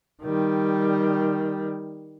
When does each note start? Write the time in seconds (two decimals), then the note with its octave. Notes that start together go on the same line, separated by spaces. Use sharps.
0.23 D#3 G3